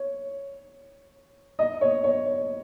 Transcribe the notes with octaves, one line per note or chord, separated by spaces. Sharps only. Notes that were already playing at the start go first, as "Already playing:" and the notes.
Already playing: C#5
D#5
C#5
C#5